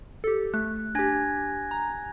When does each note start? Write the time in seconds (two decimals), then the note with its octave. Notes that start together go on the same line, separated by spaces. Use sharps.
0.24 G4 A4
0.54 A3 F#6
0.95 D4 G4 G#5 G#6 A#6
1.71 A#5